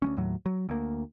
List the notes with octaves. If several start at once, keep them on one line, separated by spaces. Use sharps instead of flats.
D2 G#3 C#4
D#2 A2 F#3
F#3
D2 A#3